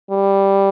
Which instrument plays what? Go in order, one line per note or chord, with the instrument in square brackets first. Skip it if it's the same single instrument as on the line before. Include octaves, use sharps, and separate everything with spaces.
[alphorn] G3